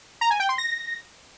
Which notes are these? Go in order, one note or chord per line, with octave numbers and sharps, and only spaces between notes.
A#5
G#5
G5
C6
A#6